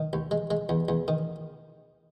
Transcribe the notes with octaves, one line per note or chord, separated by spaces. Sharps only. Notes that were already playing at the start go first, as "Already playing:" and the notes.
Already playing: D#3
D#2
G#3
G#3
E2
E2
D#3